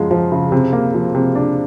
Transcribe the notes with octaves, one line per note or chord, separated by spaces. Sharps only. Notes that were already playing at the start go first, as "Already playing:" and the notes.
Already playing: F#2 C#3 F3 G#3
F3
C#3
C3
A#3
F3
C3
D4